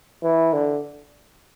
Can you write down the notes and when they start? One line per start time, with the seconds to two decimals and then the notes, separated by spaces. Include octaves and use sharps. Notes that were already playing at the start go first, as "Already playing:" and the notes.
0.23 E3
0.53 D3